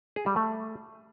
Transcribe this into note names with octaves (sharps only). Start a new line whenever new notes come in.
G#4
G3
A3